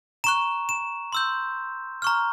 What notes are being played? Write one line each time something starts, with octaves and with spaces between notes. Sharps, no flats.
A#5 C#6 F#6 E7
E7
C6 E6 G6
A#5 C#6 F6